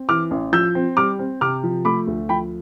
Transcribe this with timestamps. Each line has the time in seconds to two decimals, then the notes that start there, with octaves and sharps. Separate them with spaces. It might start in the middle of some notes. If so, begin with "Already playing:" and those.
Already playing: C4
0.09 E3 D6 F6
0.31 A1
0.52 F3 E6 G6
0.75 C4
0.97 G3 D6 F6
1.19 C4
1.41 C3 D6 F6
1.63 F3
1.85 A3 B5 D6
2.07 D2
2.29 F3 G5 B5